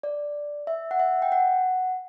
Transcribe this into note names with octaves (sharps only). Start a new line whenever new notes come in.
D5
E5
F#5
E5
G5
F#5